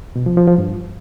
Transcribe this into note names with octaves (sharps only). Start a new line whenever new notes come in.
B2
F3
F3
F3
G2